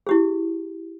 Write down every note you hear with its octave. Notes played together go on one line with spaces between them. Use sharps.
E4 G4 G#4